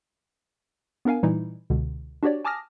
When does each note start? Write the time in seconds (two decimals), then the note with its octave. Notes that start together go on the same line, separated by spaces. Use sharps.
1.05 B3 D4 A#4 F5 G#5
1.23 A#2 E3 G3 D#4 E4
1.70 C#2 B2 D3
2.23 D4 F#4 G4 C#5 D5
2.45 G#5 A5 D6 D#6 F6 A#6